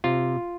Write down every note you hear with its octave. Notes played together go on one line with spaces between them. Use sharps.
C3 F4